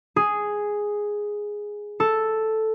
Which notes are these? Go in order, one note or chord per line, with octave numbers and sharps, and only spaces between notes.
G#4
A4